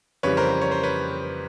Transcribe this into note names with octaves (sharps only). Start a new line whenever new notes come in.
F2 C#3 E3 G3 B4 C#5
A#4 C5
C#5
C5
B4 C#5